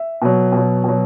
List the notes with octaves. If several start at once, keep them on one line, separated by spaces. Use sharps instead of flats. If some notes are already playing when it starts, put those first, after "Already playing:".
Already playing: E5
B2 F#3
B2 F#3
B2 F#3